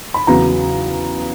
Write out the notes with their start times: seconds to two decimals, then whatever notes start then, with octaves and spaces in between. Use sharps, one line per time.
0.14 B5
0.27 E2 C#3 F#3 B3 A#5